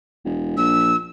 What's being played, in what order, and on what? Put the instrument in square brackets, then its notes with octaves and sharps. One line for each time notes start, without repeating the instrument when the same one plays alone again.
[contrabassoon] E1
[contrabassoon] A#1 [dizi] E6